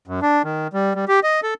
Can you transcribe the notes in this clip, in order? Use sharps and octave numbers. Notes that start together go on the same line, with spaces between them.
F#2
D4
D#3
G3
G3
G4
D#5
A4